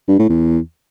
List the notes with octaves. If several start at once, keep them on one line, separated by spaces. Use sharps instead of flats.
G2
A2
E2